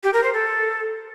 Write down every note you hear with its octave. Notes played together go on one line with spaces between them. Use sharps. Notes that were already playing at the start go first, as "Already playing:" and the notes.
G4
A#4
C5
A4